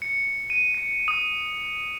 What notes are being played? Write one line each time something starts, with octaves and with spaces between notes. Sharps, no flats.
C#7
D#7
C#7
D#6